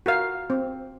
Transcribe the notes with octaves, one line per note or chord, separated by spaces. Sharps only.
F#4 A#4 F5
C4